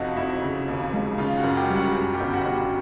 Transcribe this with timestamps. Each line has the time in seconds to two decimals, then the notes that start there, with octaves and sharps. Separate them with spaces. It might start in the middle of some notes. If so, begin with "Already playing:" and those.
Already playing: F2 C3 D#4 F#4 D#5 F5 F#5
0.16 F2 E4 E5
0.42 C#3
0.68 D#2
0.93 G#3
1.18 C#3 F4 F5
1.38 F#4 F#5
1.43 F#2
1.57 G4 G5
1.70 G3
1.76 F#4 F#5
1.95 F#2
2.14 G4 G5
2.20 G1
2.33 F#4 F#5
2.45 G1
2.53 G4 G5